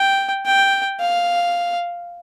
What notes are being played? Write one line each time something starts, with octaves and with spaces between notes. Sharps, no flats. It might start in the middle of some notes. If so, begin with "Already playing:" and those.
Already playing: G5
G5
F5